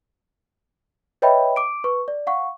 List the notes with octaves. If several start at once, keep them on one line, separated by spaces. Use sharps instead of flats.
B4 C#5 D#5 E5 G5 B5
D6 D7
B4 C#6
D5
F5 F#5 C#6